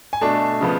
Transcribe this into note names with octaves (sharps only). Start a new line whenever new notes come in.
G#5
B2 A3 D4 A5
C#3 F3 B3